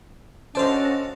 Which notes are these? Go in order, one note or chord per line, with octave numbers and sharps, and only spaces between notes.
C#4 D4 F#4 A4 C5 D#5 F5 A5